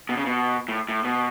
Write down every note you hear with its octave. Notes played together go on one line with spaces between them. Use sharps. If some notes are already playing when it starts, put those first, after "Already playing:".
B2
C#3
B2
A2
A2
B2